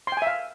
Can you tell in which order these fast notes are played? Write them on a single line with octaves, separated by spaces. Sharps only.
C6 G5 G#5 E5 F5